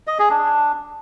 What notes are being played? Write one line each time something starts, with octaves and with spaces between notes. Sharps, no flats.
D#5
G#4
D4